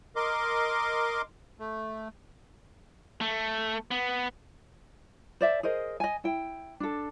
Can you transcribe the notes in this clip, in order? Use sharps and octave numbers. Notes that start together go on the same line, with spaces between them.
A#4 D#5 C6 D6
A3
A3
B3
C5 D5 E5
G#4 A#4 C5 D#5
D#5 G#5
E4 G5
D4 A4